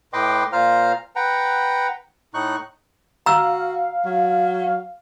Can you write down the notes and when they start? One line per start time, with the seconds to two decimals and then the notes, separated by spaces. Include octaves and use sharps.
0.13 A2 B4 D#5 G5 C6 D6
0.53 A#2 F4 C5 F5 A#5 F6
1.16 B4 F#5 G5 A#5
2.34 A2 D#4 C#6 F#6
3.26 F#4 F5 A#5 E6
4.05 F#3